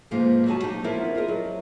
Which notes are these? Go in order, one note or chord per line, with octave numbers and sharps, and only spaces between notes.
G#2 C3 F3 A#3 B3 D#4
F#3 G3 F#4 G#5 A5
A#3 D#4 G4
F3 B3 E4 F4 A#4 D5
F4 G#4 A#4 D#5
F#3